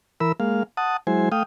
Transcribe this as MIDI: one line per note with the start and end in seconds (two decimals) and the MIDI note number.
0.20 0.32 52
0.20 0.32 70
0.20 0.32 83
0.20 0.32 88
0.40 0.63 56
0.40 0.63 58
0.40 0.63 77
0.77 0.97 78
0.77 0.97 81
0.77 0.97 87
1.07 1.29 54
1.07 1.29 56
1.07 1.29 64
1.07 1.29 72
1.07 1.29 80
1.32 1.43 57
1.32 1.43 77
1.32 1.43 79
1.32 1.43 87